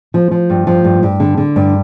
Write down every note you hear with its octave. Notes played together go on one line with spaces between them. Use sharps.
F3
F3
G2
F3
G2
G2
D3
D3
G2